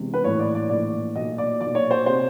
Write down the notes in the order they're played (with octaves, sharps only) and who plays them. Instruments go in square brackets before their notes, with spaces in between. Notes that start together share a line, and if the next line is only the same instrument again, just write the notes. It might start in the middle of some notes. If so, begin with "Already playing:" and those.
Already playing: [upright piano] E1 E2 C3
B4
A#1 A2 E3 C#5
D5
D5
A#1 A2 E3 D5
B1 A#2 D#5
D5
B1 A#2 D5
C#5
C5
C3 C5